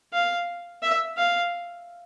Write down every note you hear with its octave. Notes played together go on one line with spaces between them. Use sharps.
F5
E5
F5